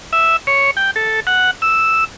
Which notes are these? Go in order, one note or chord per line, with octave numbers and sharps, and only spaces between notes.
E5
C#5
G5
A4
F#5
E6